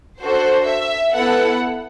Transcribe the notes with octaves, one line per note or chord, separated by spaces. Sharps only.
D4 F#4 A4 C5
E5
B3 E4 A4 F#5